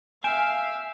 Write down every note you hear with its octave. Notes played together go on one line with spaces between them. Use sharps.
E5 F5 G#5 G6 D7 E7